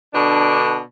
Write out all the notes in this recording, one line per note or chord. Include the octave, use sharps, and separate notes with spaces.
B2 D3 D4